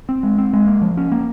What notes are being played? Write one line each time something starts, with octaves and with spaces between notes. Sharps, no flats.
C4
G#3
C4
G#3
A#3
F3
C#4
A#3